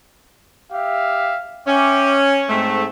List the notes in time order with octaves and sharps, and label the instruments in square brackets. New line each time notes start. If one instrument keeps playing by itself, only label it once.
[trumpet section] G4 E5 F5
[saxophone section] C#4 [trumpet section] E5 G5 D6
[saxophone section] G#2 A3 [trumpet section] C4